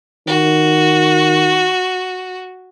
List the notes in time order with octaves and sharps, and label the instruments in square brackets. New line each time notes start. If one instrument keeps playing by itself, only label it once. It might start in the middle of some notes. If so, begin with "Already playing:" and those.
[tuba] D#3 [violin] F#4